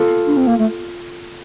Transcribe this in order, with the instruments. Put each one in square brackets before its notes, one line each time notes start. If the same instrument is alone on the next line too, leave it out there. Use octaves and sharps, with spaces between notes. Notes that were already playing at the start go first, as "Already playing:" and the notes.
Already playing: [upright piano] F4 A4
[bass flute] D4
C4
A#3
A3